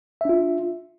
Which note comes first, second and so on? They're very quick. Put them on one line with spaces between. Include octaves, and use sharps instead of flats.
E5 D4 F4